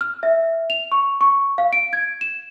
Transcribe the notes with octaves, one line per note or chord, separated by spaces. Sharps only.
F6
E5
F7
C#6
C#6
F5
D7
G#6
E7